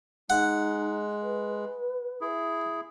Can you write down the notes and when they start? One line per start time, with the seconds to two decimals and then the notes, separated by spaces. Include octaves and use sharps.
0.30 G#3 D#4 F#5
1.22 B4
2.21 E4 G#4